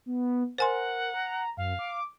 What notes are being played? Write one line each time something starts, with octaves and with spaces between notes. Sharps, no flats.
B3
A#4 C5 F#5 G#5 C6
A#5
F#2 F5
D6